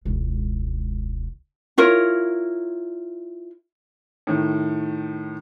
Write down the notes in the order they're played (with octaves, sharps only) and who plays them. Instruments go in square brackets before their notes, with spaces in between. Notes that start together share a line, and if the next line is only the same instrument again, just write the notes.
[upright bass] E1 C#2
[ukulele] E4 F4 A#4 C#5
[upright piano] A2 D#3